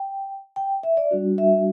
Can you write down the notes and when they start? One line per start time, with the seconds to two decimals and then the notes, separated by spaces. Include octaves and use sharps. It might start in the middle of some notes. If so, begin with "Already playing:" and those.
Already playing: G5
0.56 G5
0.83 E5
0.97 D5
1.11 G3 D4 F#4
1.38 E5